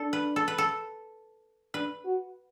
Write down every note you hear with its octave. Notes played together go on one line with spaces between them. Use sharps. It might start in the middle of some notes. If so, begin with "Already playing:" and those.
Already playing: D4 A4
B4
A4
B4
A4
D4 B4
F#4